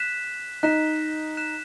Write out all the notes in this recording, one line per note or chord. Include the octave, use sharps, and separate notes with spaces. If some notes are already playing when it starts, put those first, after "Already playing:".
Already playing: F#6 B6 E7
D#4 F#6 B6 E7
F#6 B6 E7